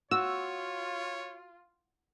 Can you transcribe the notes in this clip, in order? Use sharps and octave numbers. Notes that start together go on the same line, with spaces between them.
F4 F#4 C#5 E6